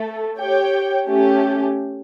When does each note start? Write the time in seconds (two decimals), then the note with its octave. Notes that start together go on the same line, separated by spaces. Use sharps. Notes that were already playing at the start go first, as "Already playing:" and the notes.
Already playing: A3 A4
0.38 G4 C#5 G5
1.08 A3 C#4 G4